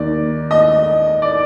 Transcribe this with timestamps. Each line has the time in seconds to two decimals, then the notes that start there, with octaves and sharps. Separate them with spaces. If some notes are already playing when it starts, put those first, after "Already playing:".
Already playing: D#2 D#3 D5
0.51 D#5
1.22 D5